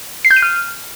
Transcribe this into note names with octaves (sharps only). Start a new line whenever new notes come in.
C7
G6
D#7
F6